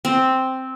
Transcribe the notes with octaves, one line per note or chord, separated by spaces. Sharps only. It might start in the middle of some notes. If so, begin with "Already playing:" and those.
C4